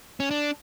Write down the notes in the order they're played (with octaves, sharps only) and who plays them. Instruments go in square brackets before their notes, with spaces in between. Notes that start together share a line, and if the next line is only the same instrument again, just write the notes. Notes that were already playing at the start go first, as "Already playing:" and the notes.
[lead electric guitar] C#4
D4